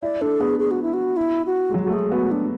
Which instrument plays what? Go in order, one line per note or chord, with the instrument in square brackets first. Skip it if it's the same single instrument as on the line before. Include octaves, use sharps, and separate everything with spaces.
[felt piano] E4 [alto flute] D5
[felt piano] D4 [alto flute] A4
[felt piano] B3 [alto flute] G#4
[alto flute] G#4
F#4
E4
F#4
E4
F#4
[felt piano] G#3
F#3
[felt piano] A3 [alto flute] F#4
[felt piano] G#3 [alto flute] G#4
[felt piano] B3 [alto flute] F#4
[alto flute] D4